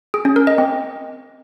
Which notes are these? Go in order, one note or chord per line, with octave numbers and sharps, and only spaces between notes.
G#4
C#4
A#4
D#5
C4